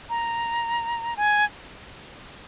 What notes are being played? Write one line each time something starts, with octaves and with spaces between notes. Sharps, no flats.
A#5
G#5